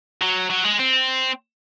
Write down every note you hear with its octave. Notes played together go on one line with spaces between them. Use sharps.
F#3
F#3
G#3
C4